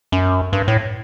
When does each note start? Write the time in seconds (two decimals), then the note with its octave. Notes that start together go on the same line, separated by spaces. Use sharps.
0.12 F#2
0.53 G2
0.68 A2